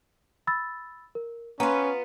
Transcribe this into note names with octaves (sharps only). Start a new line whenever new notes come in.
B5 E6 A6
A#4
B3 C#4 F4 B4 A#5